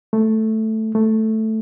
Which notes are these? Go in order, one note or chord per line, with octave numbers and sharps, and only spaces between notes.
A3
A3